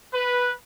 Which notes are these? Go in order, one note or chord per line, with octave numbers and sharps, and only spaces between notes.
B4